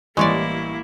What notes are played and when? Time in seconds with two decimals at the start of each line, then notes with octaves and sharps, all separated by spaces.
0.17 A1 G3 G#3 A#3 E4 C#5 D5 C#6